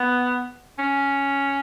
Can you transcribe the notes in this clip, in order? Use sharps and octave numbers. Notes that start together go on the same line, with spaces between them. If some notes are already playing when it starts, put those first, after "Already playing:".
Already playing: B3
C#4